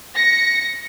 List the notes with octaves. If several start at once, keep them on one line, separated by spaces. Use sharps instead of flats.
A#6 C#7